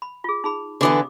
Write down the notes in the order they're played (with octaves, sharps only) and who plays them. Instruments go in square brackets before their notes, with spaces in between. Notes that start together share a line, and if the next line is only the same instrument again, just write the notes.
[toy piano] B5
F4 G#4
D#4 G#4 B5
[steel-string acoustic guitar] D3 E3 B3 [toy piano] G4 D6 D#6